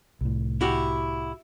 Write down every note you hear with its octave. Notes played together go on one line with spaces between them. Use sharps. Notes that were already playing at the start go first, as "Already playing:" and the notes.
C2 A2
E4 F#4 G4